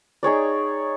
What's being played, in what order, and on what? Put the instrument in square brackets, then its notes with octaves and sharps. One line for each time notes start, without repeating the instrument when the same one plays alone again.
[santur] D#4 G#4 C#5 D5